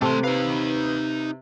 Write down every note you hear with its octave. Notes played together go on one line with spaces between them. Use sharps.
C3 A3 G4 A4 C6
D#4 B4 F5